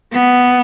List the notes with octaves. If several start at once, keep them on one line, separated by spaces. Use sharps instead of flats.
B3